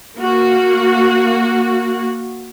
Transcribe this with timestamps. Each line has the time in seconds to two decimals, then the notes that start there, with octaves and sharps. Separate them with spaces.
0.17 A#3 F#4